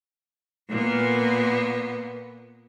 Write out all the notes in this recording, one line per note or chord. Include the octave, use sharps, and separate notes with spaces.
A#2 B3